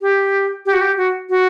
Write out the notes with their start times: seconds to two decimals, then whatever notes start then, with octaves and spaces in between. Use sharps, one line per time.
0.01 G4
0.66 G4
0.73 F#4
0.81 G4
0.98 F#4
1.30 F#4